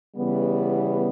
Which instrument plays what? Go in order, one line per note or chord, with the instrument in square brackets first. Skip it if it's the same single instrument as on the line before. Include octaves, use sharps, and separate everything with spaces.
[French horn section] C#3 E3 G3 B3